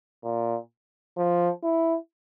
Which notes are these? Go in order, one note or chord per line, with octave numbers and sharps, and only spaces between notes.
A#2
F3
E4